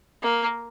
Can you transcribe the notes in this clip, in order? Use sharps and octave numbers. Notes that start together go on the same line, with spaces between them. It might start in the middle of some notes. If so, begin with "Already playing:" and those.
A#3